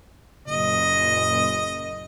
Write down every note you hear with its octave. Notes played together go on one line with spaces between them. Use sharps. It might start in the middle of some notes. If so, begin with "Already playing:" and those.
F#1 A#2 D#5